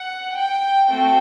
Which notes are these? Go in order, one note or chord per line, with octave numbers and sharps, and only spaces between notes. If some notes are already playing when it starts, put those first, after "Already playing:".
Already playing: F#5
G5
A3 C4 F#4 A4 G5